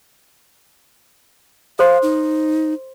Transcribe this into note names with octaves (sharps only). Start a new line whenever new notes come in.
A4 C5 F5 C6
D#4